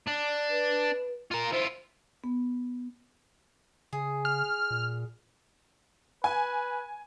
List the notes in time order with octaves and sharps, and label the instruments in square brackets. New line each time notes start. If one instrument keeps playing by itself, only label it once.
[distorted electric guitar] D4
[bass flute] B4
[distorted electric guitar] F4 A#4
[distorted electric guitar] E4 F4 [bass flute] C5
[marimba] B3
[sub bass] C#3 [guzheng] G#4
[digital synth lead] F6
[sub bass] A#2
[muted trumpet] B4 [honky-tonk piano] G#5